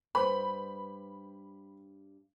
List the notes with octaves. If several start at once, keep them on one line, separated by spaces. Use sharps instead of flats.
G2 B4 C5 B5